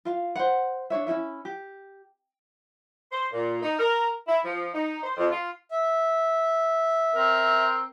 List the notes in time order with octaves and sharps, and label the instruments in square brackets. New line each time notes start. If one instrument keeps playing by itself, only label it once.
[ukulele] F4 F5
C5 F#5
D4 D#4 C#5 E5
C#4 E4 F4 E5
G4
[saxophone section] C5
A#2
D#4
A#4
E4
F3
D#4
C5
F2
F4
[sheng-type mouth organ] E5
[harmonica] C4 A#4